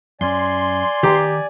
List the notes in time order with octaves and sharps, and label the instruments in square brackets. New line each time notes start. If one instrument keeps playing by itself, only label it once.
[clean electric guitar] F#2 C#4 [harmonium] D5 G#5 [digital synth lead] C6
[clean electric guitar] D#3 A#5 [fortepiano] G4